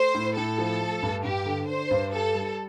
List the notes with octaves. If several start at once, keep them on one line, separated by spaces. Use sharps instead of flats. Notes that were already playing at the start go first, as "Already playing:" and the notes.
Already playing: A3 C5
A2
A2 A4
F3
A3
G2
G2 G4
D3
D4 C5
G2
G4 A4
G3